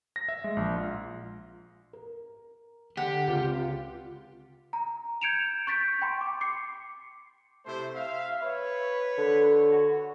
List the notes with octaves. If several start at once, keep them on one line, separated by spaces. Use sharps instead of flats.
A#6
E5
G#3
A#1
F4
A#4
D3 G4 F#5
C#2 C4 F4
A#5
G6 G#6 C#7 D7 E7 F7
C#6 G6 A6 B6 D7
G5 B5 C6
D6
D6 C7 C#7
C3 A3 E4 C5
E5 F5
B4 C#5
D3
F#4